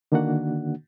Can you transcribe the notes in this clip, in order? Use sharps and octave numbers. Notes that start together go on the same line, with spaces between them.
D3 D#3 A#3 D4 F#4 F#5